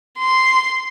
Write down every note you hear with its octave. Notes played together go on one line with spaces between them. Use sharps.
C6